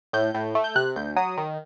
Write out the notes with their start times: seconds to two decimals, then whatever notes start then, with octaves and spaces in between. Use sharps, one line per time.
0.13 A2 G6
0.34 A2
0.55 A3
0.64 G6
0.75 C3 F#6
0.96 D2 G6
1.16 F#3 D#6
1.37 D#3